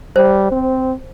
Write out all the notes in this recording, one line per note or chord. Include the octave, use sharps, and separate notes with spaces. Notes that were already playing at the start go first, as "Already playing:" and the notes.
G3 C5
C4